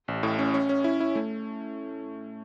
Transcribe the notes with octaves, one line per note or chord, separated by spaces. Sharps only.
A1
A2
C#4
C#4
C#4
E4
E4
A3